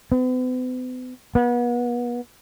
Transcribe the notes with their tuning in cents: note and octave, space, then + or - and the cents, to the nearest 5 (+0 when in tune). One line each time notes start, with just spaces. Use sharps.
B3 +45
B3 -35